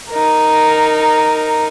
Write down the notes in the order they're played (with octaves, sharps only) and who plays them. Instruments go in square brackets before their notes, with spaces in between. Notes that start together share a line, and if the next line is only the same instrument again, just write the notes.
[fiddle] D#4 A#4